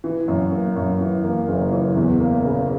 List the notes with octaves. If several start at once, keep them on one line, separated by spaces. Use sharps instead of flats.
E3
F#2
A#3
F#2
E3
A#3
F#1
E3
E2
A#3
C#3